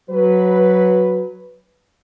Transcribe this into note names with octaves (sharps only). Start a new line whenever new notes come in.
F#3 B4